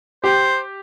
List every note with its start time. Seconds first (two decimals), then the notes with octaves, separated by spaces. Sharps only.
0.24 G4 C5